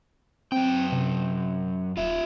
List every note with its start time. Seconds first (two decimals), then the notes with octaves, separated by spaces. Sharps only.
0.52 F#2 C4 G5
0.92 C3
1.97 D#1 F4 E5